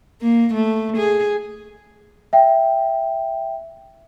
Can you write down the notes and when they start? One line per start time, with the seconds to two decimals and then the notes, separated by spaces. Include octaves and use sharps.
0.21 A#3
0.53 A3
0.96 G#4
2.33 E5 G5